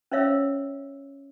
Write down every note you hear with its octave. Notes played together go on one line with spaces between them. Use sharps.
C#4 C5 C#5 E5 F5 E6